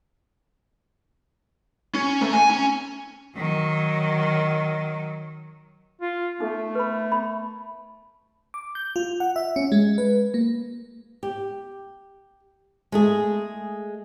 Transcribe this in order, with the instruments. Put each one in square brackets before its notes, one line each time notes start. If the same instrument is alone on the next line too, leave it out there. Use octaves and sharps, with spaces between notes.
[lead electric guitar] C#4
A3
G#5
C#4
[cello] D#3 F#3
[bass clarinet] F4
[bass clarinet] A3 [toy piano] D#4 A4
[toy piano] B4 B5
B5
[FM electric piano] D6
G6
F4
F#5
E5
C#4
G#3
B4
A#3
[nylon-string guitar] G4
G#3 A3 G#4